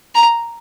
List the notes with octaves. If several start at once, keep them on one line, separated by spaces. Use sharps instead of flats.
A#5